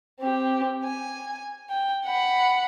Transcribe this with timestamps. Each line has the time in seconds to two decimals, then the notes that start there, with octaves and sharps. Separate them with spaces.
0.21 C4 G4
0.84 G#5
1.70 G5
2.06 F#5 B5